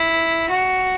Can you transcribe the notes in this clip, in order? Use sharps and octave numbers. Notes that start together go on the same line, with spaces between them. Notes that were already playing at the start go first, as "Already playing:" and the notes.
Already playing: E4
F#4